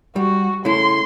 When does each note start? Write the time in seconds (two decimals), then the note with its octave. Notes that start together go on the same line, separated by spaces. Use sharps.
0.16 G3 F#4
0.65 C#3 A3 E4 C6